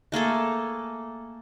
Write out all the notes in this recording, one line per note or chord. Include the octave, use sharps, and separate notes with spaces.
A3 A#3 G#4 A4